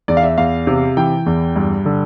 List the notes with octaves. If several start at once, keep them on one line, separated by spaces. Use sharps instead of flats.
E2 D5
F5
E5
E2 F5
C3
E3 G5
E2
G2
D3